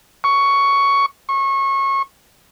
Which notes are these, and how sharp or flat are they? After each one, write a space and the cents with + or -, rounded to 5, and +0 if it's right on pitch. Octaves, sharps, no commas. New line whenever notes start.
C#6 +10
C#6 -25